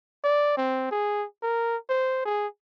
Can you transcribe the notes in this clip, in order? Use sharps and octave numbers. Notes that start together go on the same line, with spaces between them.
D5
C4
G#4
A#4
C5
G#4